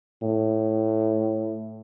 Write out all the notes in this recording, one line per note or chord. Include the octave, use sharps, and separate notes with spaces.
A2